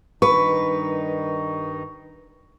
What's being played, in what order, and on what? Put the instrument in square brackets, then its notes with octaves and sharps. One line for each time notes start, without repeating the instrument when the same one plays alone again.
[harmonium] G2 D#3 D#4 [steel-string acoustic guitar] B4 [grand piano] C#6